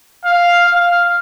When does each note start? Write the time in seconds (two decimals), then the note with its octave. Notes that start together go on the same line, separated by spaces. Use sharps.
0.25 F5
0.66 F5